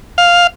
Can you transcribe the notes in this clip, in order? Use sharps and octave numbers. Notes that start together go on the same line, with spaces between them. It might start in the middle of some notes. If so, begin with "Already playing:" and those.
F5